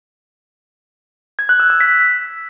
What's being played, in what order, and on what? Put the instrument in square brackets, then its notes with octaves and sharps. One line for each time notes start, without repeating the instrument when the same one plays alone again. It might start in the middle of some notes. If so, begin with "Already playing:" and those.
[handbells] G#6
F#6
E6
E6
B6